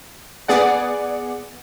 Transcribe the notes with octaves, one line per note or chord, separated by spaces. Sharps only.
B3 G#4 D5 F#5